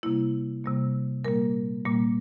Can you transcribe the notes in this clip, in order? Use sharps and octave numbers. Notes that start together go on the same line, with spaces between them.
C3 G3 A#3 E4
C3 G3 A#3
A#2 G3 A#3 A#4
A#2 G3 A#3